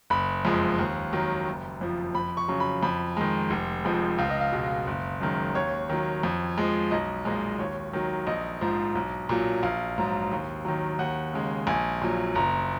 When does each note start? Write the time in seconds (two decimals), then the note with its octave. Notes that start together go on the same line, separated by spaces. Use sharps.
0.10 F#1 B5
0.45 F2 F3 G#3
0.79 D#2
1.13 D#3 F#3
1.47 F#1
1.81 F2 F3
2.14 F2 B5
2.37 C#6
2.48 C#3 F#3
2.60 B5
2.83 F2 B5
3.17 D#3 G#3
3.50 F1
3.85 F2 F3 G#3
4.18 C#2 F5
4.30 D#5
4.41 F5
4.52 B2 G#3
4.87 F#1
5.21 F#2 D#3 G#3
5.54 D#2 C#5
5.89 D#3 F#3
6.23 F2
6.58 F3 G#3
6.91 B1 D#5
7.25 A#2 F3 G#3
7.59 D#2 C#5
7.93 D#3 F#3
8.27 A#1 D#5
8.61 G#2 F3
8.95 B1
9.29 A#2 F#3
9.63 A#1 F5
9.98 G#2 F#3
10.31 D#2
10.65 D#3 F#3
10.99 D#2 F#5
11.33 C#3 G#3
11.67 A#1 G#5
12.02 A#2 F#3
12.35 F#1 A#5